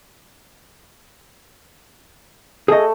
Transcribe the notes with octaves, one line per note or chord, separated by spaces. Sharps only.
A3 G#4 A4 D#5